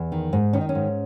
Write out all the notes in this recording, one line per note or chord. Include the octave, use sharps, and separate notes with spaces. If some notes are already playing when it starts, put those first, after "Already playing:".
Already playing: E2
D#3
G#2
D#3 C#4
D#4
C#4
G#2